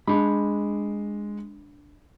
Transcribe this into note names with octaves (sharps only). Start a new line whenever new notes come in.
G#3 D4 B5